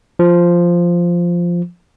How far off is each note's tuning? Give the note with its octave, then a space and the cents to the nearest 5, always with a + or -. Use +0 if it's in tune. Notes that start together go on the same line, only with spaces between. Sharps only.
F3 -5